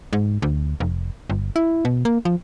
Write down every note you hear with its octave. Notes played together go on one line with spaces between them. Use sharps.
G#2
D2
F1
G1
E4
B2
A#3
F3